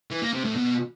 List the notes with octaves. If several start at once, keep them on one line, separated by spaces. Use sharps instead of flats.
E3
A#3
C3
A2
B2